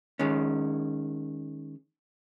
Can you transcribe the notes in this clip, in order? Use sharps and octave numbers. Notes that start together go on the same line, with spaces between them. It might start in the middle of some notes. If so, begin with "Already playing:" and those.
D#3 G#3 C#4